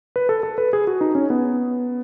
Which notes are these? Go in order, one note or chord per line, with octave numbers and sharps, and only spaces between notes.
B4
A4
A4
B4
G#4
F#4
D#4
C#4
B3